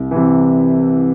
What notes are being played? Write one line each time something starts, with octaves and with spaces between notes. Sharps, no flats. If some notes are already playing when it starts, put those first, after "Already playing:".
Already playing: C2
C3 E3